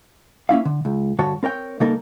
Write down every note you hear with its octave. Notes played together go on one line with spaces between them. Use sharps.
A#3 C#4 E4 F5
D3
C#2
G2 D3 F#4 C#5 A5
C4 A#4 C#5 G5
C#3 G3 A#3 D#4 A4 A#4